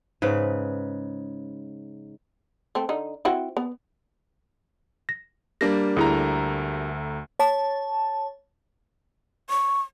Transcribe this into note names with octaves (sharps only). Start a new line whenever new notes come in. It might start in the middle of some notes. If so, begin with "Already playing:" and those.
G#2 C#3 B4
A3 C4
D3 D#4
C4 E4 F#4
B3
A#6
G3 A#3 D4 A#6
D2 A3 E4 G#4 A#5
C#5 A5
C#6